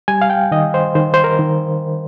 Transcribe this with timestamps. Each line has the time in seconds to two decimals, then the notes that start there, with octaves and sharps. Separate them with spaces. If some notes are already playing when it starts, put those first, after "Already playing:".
0.08 G3 G#5
0.21 F5
0.30 G5
0.51 D#3 D#5
0.74 C5
0.95 D#3 C5
1.14 C5
1.24 A#4
1.39 D#3